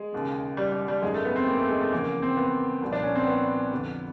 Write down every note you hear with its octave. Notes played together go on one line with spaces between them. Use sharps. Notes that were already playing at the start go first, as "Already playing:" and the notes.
Already playing: G#3
E1 D#2 C#3
G3
G3
G3
G#1 F#2 D#3 G#3
A3
B3
C4
A#3
A3
G#3
A3
F1 E2 C#3 A#3
C4
B3
C2 A#2 F3
D4
C#4
C4
B3
F1 F2 D3